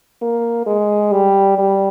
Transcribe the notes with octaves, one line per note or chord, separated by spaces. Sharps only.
A#3
G#3
G3
G3